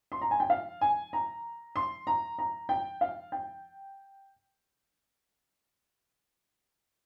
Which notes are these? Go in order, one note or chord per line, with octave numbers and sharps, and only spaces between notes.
C6
A#5
G#5
G5
F5
G#5
A#5
C6
A#5
A#5
G5
F5
G5